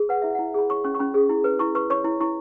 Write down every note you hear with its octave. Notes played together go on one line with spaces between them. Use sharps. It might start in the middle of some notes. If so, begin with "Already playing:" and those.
Already playing: G#4
B4 F#5
E4 E5
E4 F#5
G#4 B5
C#5 C#6
C#4 C#6
C#6
C#4 B5
G#4
E4
B4
E4 C#6
B4 C#6
C#5 C#6
E4
E4 C#6